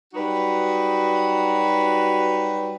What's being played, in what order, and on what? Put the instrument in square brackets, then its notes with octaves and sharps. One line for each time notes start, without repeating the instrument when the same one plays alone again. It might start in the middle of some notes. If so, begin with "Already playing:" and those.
[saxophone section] F#3 G3 D#4 F#4 B4